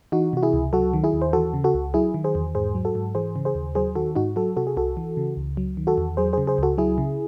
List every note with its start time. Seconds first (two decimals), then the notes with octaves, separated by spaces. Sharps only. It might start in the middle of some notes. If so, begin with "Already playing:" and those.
0.12 E3 D#4 F#4
0.33 C3 F#4
0.43 E4 G#4
0.53 C#2
0.73 F#3 F#4 A4
0.94 D#3
1.04 E4 G#4
1.13 D#2
1.22 C5
1.33 E3 F#4 A4
1.54 C#3
1.64 F#4 A4
1.75 C#2
1.94 F#3 E4 G#4
2.14 D#3
2.24 G#4 C5
2.35 E2
2.55 G#2 G#4 C5
2.75 F#3
2.85 F#4 A4
2.95 G#2
3.15 E3 G#4 C5
3.36 C#3
3.45 G#4 C5
3.55 D#2
3.75 F#3 G#4 C5
3.95 D#3 F#4 A4
4.16 G#2 D#4 F#4
4.36 F#3 F#4 A4
4.57 C3 F#4 A4
4.67 G#4
4.77 C2 F#4 A4
4.97 E3
5.17 C#3
5.37 C#2
5.57 F#3
5.77 D#3
5.87 F#4 A4
5.98 E2
6.17 F#3 G#4 C5
6.33 C#3 G#4 C5
6.47 G#4 C5
6.58 C#2 F#4 A4
6.78 F#3 E4 G#4
6.98 C#3